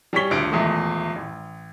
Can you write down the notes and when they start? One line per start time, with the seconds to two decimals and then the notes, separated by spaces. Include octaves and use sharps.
0.13 G3 G#4 C#5 C#6 B6 G7
0.30 D#1 D2 D7
0.52 D#1 E2 G#3 A3
1.16 A1